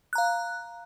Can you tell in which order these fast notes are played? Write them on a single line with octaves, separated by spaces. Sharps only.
F#6 A#5 F5